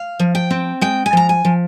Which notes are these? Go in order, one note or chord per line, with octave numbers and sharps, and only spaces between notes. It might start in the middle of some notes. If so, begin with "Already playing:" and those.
Already playing: F5
F3
G5
C4
G#3 G5
G#5
F3 A#5
G#5
F3